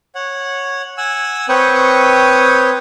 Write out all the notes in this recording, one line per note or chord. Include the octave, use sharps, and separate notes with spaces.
C#5 F#5
F#5 G#5 E6
C4 B4 C#5 G5 C#6 D#6